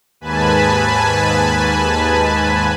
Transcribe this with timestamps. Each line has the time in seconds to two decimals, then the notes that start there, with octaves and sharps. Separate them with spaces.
0.21 D#2 G#2 B4 G#5 A5 B5